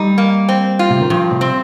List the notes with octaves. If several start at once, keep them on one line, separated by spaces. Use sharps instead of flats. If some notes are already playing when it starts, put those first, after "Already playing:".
Already playing: G2 G3 D#4
A#3
C4
F4
C3
D#3
G2 F3
C3
C4